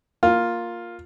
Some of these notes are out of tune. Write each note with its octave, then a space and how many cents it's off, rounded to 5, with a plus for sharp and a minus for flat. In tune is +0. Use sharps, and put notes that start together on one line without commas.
A#3 +0 F4 +5